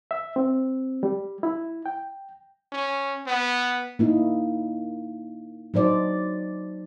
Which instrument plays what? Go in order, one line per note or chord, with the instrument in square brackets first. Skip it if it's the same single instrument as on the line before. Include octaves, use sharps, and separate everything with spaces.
[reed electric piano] E5
C4
G3
E4
G5
[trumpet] C#4
B3
[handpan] A#3 D#4 E4
F#3 D#4 C5 D5